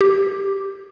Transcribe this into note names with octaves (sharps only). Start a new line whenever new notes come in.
G4